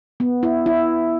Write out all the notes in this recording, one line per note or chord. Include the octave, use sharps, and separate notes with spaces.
B3
E4
E4